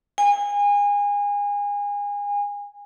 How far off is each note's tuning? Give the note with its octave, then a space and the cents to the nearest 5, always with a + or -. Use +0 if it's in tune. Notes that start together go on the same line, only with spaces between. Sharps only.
G#5 -30